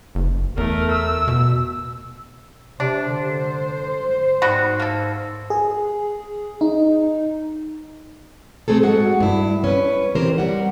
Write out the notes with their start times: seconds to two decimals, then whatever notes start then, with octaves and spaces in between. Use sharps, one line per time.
0.15 F#1
0.57 E2 A3 A#4
0.92 E6
1.28 B2
2.80 C3 D4 C5
3.09 D3
4.42 G#2 G3 B3 F#4
4.80 A#3 A4
5.50 G#4
6.61 D#4
8.68 A3 C4 G#4 A4
8.82 G#2 G#3 F#4 F#5
9.20 G2 E4
9.64 C#4 B4
10.15 E3 C4 G4 A#4 C5
10.38 G3 F#5